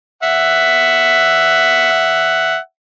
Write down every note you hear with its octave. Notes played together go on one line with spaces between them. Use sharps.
E5 F#5